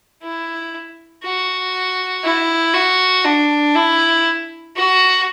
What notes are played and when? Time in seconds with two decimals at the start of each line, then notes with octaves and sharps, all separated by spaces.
0.22 E4
1.24 F#4
2.24 E4
2.74 F#4
3.25 D4
3.75 E4
4.76 F#4